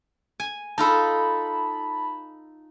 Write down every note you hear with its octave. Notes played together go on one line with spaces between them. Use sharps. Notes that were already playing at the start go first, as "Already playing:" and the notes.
G#5
D#4 F4 A4 A5 B5